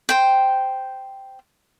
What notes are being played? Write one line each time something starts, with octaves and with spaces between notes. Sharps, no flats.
C5 G5